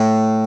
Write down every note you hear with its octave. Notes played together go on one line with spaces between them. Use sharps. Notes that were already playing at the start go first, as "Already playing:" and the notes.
Already playing: A2